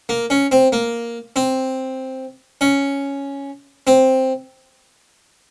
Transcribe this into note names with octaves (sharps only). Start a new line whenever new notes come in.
A#3
C#4
C4
A#3
C4
C#4
C4